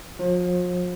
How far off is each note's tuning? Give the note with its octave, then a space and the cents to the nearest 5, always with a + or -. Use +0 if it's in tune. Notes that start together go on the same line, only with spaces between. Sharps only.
F3 +40